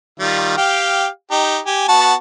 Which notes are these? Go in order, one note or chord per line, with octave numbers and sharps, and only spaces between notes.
D#3 G3 F4
G4 F5 G5
D#4 G4
G4 G#5
B3 F#4 A5